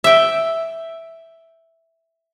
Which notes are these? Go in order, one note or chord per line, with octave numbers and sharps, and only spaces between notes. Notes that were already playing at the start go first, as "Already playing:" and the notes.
E5 G5